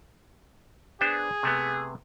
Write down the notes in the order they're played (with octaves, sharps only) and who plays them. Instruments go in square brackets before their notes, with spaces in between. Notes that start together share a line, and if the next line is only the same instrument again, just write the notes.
[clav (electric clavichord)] B3 D4 C5 [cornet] G#4
[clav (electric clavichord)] C3 A3 B3